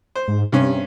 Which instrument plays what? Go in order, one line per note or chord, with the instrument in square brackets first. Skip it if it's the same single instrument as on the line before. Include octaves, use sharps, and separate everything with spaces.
[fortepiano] C5
[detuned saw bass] G#2
[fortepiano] G2 C#4 [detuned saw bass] C3